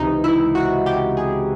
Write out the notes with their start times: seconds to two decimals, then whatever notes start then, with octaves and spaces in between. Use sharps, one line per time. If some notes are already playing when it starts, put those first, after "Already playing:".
Already playing: C#2 C3 E3 D#4
0.24 E4
0.55 F#4
0.86 G4
1.17 G#4